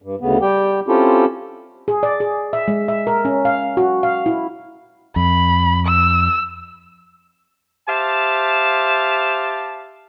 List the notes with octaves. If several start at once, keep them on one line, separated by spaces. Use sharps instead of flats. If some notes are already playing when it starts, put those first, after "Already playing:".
G2
D2 C#3 B3
G3 G4 G5
C4 C#4 E4 F4 G4 A4
G#4
D5
G#4
E5
G#3
E5
A#4
C#4
F5
F#4
F5
E4
F2 B5
E6
G4 C5 E5 F5 A5